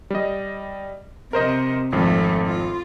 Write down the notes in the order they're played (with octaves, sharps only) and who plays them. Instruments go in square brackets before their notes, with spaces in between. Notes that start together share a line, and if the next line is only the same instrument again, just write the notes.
[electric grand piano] G3 D#5
[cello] C3 [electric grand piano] A#4 C5 D#5
[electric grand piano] G#1 F2 [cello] A3
[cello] F4